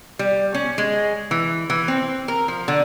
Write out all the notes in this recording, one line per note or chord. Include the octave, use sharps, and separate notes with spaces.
G3
C#4
G#3
E3
E3
C4
A#4
F3
D3